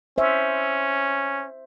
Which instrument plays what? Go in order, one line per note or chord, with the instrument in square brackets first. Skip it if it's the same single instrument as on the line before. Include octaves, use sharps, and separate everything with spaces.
[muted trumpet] C#4 [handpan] C5 E5